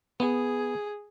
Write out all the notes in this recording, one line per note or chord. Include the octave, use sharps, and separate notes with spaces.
B3 G#4